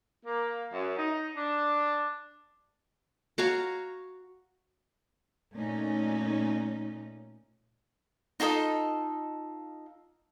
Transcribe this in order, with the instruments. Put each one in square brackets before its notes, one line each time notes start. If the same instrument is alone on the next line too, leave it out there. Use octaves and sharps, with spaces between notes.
[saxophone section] A#3
F#2
D#4
D4
[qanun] F#4 C#5 F5 A#5
[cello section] A#2 A3 C#4 D#4
[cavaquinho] D#4 F4 A4 D#5